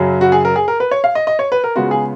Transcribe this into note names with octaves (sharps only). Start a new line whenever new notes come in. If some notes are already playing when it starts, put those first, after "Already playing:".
Already playing: F#2 C#3 F#3
F#4
G#4
A#4
G#4
A#4
B4
C#5
F5
D#5
D#5
C#5
B4
A#4
C#3 G#3 B3 F4 F#4
G#4